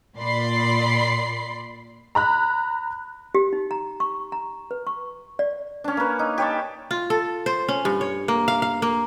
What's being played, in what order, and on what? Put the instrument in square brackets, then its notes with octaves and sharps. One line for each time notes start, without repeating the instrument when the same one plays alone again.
[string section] A#2 D5 B5 C6 C7
[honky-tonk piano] A#5 B5 F#6
[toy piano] G4
D#4
A#5
C#6
A#5
B4
C#6
D5
[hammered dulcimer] C#4 D4
A#3 B4
D#4
G4 C#5 A5
[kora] F4
A4
C5
C#4
G2
C#5
A#3
F5
F5
A#3